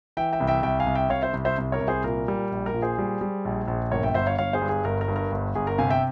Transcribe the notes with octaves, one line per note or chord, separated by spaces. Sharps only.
E3 E5 G5
E5 G5
C2
E5 G5
C2 E5 G5
F5 G#5
C2
E5 G5
C2 C#5 F5
C5 E5
C2
C5 E5
C2
A#4 C#5
C2
G#4 C5
A#2 A#4
G3
A#1
A#4
A#2
G#4 C5
G3
G3
A#1
A#1
G1 A#4 C#5
E5 G5
G1 C5 E5
C#5 F5
G1 C#5 F5
G#4 C5
G2
G#4
G1 A#4
A#4
G2
A#4
G1
G1 G#4
A#4
C3 F5 G#5
E5 G5